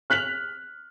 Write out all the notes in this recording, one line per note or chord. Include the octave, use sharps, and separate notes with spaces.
F6 F#6 B6 F7 F#7